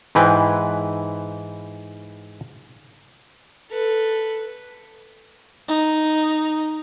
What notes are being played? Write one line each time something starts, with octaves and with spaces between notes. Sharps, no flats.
G#2 E3 B4 G5
A4 B4
D#4